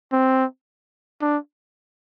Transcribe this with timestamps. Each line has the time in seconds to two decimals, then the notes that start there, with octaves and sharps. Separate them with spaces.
0.12 C4
1.21 D4